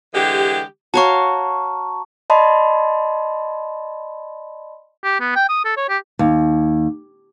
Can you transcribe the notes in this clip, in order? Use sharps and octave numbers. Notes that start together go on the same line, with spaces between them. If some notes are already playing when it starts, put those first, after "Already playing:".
D3 E3 G#3 G4
F#4 C#5 F5 A5 A#5 C#6
D5 D#5 A5 B5 C6
G4
B3
G5
D#6
A4
C#5
G4
D#2